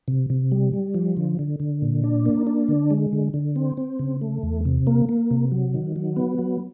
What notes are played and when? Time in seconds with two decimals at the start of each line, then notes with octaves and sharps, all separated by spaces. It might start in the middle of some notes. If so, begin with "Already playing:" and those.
0.08 C3
0.30 C3
0.52 G3
0.73 G3
0.94 F3
1.17 D3
1.39 D3
1.60 D3
1.82 A#2
2.04 D4
2.26 A#3
2.47 D4
2.68 D3
2.91 G#3
3.13 D3
3.34 D3
3.56 C4
3.77 C4
3.99 C#3
4.21 A3
4.43 E2
4.65 C3
4.87 A#3
5.09 A#3
5.31 C3
5.52 F#3
5.74 D#3
5.96 F#3
6.16 B3
6.39 F#3